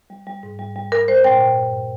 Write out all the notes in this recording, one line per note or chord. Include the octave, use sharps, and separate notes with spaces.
G3
G3
G#2
G3
G3
G3 A#4
G3 C5
A#2 G5
A#2
G2